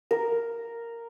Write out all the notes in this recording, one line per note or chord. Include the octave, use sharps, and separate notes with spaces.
A#4